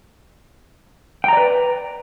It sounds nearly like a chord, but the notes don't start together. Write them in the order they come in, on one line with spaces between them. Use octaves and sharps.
G5 A#5 D5 B4